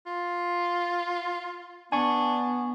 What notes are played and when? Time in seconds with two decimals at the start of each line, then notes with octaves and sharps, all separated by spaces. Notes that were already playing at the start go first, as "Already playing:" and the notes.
0.06 F4
1.92 B3 D4 G#5 C#6